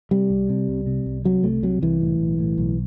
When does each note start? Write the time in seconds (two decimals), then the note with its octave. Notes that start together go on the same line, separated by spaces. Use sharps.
0.11 C3 G3
0.30 C2
0.49 C3
0.68 C2
0.87 C3
1.06 C2
1.25 C3 F#3
1.43 C2 A3
1.63 C3 F#3
1.82 C2 E3
2.01 A2
2.20 B1
2.39 A2
2.58 B1